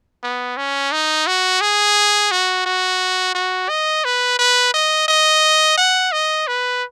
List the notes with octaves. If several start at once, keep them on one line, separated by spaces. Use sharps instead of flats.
B3
C#4
D#4
F#4
G#4
F#4
F#4
F#4
D#5
B4
B4
D#5
D#5
F#5
D#5
B4